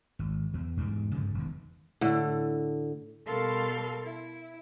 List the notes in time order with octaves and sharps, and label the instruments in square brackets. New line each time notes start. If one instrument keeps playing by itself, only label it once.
[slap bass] G#1
E2
E2 G#2 G3
G2 C#3 F3 G#3
E1 D#3
[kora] A2 D3
[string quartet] B2 G3 A4 A#4 F5 C6
E4